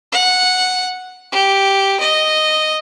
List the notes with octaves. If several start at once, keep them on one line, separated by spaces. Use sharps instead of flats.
F#5
G4
D#5